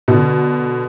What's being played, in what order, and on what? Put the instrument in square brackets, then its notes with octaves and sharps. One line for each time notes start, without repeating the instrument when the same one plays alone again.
[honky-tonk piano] B2 D3